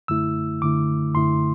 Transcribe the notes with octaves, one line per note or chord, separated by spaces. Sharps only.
F#2 D3 A3 E4 E6
F#2 D3 A3 E4 D6
F#2 D3 A3 E4 C6